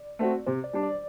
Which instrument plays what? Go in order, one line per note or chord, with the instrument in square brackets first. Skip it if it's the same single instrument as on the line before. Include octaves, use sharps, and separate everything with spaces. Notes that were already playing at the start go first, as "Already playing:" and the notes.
Already playing: [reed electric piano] D5
[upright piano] A3 C4 F#4
[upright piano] C3 [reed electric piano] C5
[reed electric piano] D5
[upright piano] G3 D4
[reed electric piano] D5